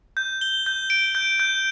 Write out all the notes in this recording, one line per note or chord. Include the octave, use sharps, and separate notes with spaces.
G6
G7
G6
D7
G6
G6